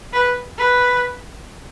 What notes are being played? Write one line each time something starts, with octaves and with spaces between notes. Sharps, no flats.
B4
B4